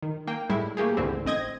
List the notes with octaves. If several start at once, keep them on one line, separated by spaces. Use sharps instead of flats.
D#3
A#3 G5
A2 G3 G#3 E4
E3 A3 A#3 G4 G#4
C#2 G#2 D3 E3 A3 C4
A1 C4 D#5 G#6 A#6